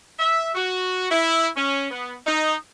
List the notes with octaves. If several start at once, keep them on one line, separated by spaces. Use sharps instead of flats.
E5
F#4
E4
C#4
B3
D#4